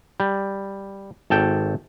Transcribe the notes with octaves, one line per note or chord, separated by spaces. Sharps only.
G3
G#1 A4 G5